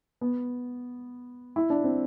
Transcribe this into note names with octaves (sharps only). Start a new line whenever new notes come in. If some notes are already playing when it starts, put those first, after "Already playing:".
B3
E4
D4
C4